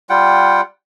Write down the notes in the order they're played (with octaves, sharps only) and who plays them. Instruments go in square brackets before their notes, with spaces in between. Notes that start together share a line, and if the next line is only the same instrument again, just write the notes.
[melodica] G3 F4 F#5 G5